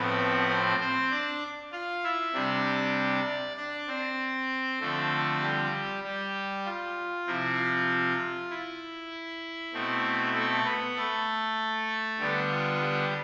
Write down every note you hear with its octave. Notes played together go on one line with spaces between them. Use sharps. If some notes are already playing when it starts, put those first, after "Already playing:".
Already playing: A2 F3 B3 C4 B4
C4 C5
C4 C5
D4 D5
F4 F5
E4 E5
C3 G3 D4 D5
D4 D5
C4 C5
D3 F3 A3 C4 A4
G3 G4
G3 G4
F4
C3 F3 C4 E4
F4
E4
B2 A3 C4
A3 A4
B3 B4
A3 A4
D3 G3 B3 D4 G4
F4
G3 G4